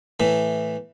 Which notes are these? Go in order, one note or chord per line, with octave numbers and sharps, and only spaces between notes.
A2 E3